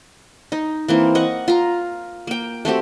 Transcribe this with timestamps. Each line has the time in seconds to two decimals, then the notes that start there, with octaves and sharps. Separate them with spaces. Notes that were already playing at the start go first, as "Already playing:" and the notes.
0.52 D#4
0.88 E3 A#3 C4
1.15 D#5 F#5 C#6
1.48 F4 A#5
2.27 A#3 G5
2.65 A3 C4 F#4 G4